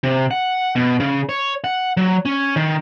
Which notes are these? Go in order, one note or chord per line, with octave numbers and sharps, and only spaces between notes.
C3
F#5
B2
C#3
C#5
F#5
F#3
C#4
D#3